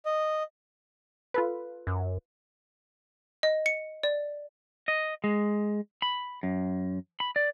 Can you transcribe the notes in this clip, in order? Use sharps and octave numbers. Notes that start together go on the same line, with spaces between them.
D#5
F4 A4 B4
F#2
D#5
C#7
D5
D#5
G#3
B5
F#2
B5
D5